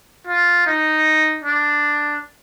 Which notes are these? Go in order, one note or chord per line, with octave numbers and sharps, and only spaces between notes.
F4
D#4
D4